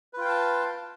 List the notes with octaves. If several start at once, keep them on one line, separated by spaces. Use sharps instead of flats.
F4 B4 F5 G5 A5